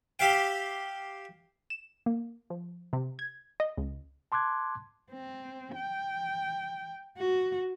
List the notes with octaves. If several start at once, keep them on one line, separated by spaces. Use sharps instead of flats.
G4 E5 F5 G5
E7
A#3
F3
C3
G#6
D#5
C#2
A5 C6 D6 F#6 G#6
C4
G5
F#4